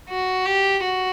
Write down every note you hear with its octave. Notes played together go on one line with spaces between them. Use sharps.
F#4
G4
F#4